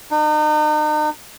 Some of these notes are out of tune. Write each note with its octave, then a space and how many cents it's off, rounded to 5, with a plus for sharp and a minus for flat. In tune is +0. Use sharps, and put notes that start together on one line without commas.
D#4 -40